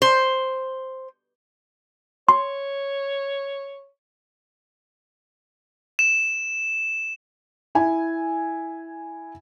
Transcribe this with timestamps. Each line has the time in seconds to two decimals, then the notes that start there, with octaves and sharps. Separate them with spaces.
0.02 C5
2.29 C#5 C6
5.99 E7
7.75 E4 G#5